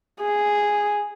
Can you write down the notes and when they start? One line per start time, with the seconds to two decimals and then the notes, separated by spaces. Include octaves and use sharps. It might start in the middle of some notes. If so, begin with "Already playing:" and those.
0.22 G#4